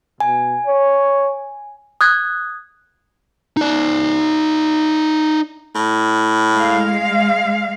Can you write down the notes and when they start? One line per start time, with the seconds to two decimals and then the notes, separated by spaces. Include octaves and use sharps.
0.20 B2 G#5
0.66 C#5
2.01 D#6 F#6 G#6
3.57 D#4 D5
5.75 A2
6.53 G#3 F5